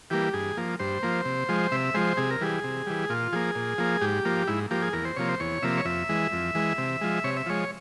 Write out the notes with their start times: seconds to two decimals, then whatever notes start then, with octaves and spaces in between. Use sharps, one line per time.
0.10 E3 G3 A#3 G4
0.33 G2 G#4
0.57 F3 A#3
0.79 G2 C5
1.03 F3 A#3
1.25 C3
1.49 F3 G#3
1.72 C3 E5
1.94 F3 G#3 C5
2.17 C3 G#4
2.30 A#4
2.41 E3 G3 G#4
2.64 C3
2.87 E3 G3
3.09 A#2 F4
3.33 F3 A#3 G#4
3.55 A#2
3.78 F3 A#3
4.01 G#2 G4
4.25 F3 A#3
4.47 G#2 E4
4.71 F3 A#3 G4
4.82 G#4
4.93 E2 A#4
5.05 C5
5.16 C3 F3 A#3 C#5
5.29 C5
5.40 E2 C#5
5.62 C3 F3 A#3 E5
5.78 C#5
5.85 F2 E5
6.09 E3 G#3
6.32 F2
6.55 E3 G#3
6.78 C3
7.01 F3 G#3
7.24 C3 C#5
7.37 E5
7.46 F3 G#3 C#5